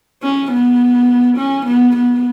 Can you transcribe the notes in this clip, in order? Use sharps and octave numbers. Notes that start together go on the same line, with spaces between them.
C#4
B3
C#4
B3
B3